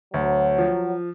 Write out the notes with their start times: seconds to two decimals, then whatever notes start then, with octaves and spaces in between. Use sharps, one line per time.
0.14 D2 F#3
0.58 F3